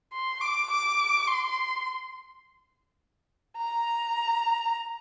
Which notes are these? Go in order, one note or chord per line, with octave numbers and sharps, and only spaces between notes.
C6
D6
D6
C6
A#5